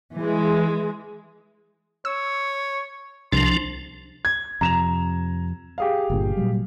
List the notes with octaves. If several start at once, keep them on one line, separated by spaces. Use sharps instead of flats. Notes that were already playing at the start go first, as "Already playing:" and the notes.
E3 G#3
C#5 E6
C2 F3 D4 C6 A#6
G#6
F2 C3 A#5 E7 F7
G4 G#4 F5
G1 A#2 D3
A#2 F#3 G3